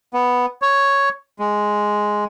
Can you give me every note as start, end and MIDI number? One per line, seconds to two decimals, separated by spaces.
0.14 0.46 59
0.62 1.09 73
1.39 2.25 56